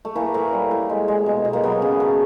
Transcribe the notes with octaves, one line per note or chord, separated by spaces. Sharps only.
A3
E3 A#3
A2
G3
A2
G#3
G#3
B2
B2
A#3
F#3 B3
C#3
A3